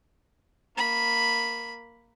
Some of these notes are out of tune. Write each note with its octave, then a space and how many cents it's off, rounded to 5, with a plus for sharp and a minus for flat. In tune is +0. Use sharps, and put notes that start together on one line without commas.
A#3 +0 B5 +0